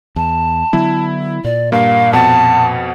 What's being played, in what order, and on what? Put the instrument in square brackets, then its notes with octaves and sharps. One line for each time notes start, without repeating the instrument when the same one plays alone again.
[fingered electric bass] E2 [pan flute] A5
[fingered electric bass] D3 F#3 B3 [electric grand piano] E4
[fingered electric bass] A#2 [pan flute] D5
[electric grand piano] G2 A#3 [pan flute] F5
[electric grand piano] F2 B2 [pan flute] F#5 [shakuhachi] A5